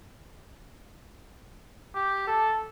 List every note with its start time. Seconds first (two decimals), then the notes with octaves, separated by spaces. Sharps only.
1.95 G4
2.27 A4